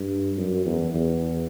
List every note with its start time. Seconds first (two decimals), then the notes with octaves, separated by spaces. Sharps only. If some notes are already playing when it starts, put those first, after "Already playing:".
Already playing: G2
0.37 F#2
0.65 E2
0.94 E2